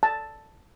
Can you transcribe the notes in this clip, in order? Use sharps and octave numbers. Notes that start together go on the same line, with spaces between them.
A5